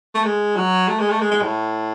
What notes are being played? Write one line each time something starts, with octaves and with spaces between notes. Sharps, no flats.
A3
G#3
F#3
A3
G#3
A3
G#3
G#3
A2